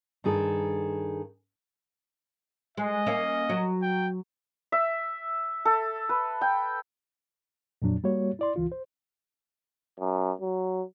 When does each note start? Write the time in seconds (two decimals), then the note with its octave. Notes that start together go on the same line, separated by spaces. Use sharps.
0.24 G2 D#3 G#4 A4
2.77 G#3 D#5
3.07 A#3 C#4 E5
3.49 F#3
3.82 G5
4.72 E5
5.65 A4
6.09 B4
6.41 G5
7.82 F2 A#2 F#3 D4
8.04 G3 A#3 F#4 C#5
8.39 E4 D5 C6
8.56 C#2 E3 F4
8.72 C5
10.00 F#2
10.41 F#3